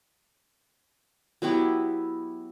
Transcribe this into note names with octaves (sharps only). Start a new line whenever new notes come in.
F#3 B3 E4 G4